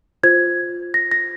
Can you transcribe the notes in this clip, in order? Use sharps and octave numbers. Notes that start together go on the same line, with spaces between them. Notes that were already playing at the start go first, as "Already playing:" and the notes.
F4 C5 G#6
A#6
A#6